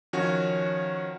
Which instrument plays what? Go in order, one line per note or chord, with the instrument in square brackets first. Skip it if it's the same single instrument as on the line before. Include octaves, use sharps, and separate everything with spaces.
[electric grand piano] D#3 F3 C#4 F#4 C#5